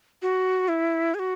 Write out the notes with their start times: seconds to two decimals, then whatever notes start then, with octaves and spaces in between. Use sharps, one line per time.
0.22 F#4
0.68 E4
1.14 G#4
1.19 F#4